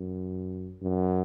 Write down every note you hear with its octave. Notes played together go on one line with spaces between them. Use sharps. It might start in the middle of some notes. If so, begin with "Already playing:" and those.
Already playing: F#2
F#2